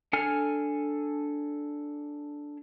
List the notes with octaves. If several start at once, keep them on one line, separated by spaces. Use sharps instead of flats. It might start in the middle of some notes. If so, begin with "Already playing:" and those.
D4 A4 G#5 F6